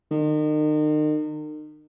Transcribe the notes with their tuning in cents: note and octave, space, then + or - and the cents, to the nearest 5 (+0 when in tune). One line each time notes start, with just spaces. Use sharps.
D#3 -35